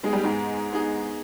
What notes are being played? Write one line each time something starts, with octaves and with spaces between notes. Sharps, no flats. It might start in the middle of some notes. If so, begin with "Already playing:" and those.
G#3 B3 D#4 G#4
G3
G#2 G#3
B3 D#4 G#4